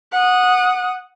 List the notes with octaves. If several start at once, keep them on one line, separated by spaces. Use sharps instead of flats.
F#5 D#6